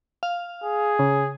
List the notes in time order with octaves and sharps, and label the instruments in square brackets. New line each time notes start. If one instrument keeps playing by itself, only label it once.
[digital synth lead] F5
[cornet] G#4
[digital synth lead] C#3